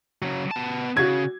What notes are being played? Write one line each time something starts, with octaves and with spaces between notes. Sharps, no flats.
C#3 F#3
B3 A5
C#3 F#4 G#6